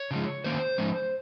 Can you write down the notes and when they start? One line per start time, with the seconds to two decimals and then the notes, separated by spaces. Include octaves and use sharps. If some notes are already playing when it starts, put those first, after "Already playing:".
Already playing: C#5
0.11 C#3 F3 G#3
0.44 D#3 A#3 C#4 C5
0.78 F3 G#3 C#4